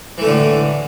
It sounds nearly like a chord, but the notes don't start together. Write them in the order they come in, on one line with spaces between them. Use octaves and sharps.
E3 A3 D3 A2